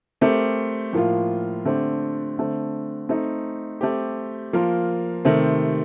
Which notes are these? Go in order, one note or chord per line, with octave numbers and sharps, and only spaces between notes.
A3 C4 G4 A#4
A2 F3 A#3 F4
D3 A3 C4 G4
D3 A3 C4
A3 C4 D#4
A3 C4 G4
F3 A#3 F4 A#4
C3 D#3 A3 C4